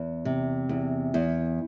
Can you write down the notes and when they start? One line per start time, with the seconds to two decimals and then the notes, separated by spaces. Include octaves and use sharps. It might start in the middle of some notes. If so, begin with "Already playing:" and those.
Already playing: E2
0.25 C3
0.69 E2
1.14 E2